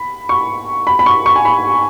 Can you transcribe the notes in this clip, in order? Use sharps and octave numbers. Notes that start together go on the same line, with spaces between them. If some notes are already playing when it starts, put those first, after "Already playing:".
Already playing: B5
C#6
B5
B5
C#6
C#6
G#5
B5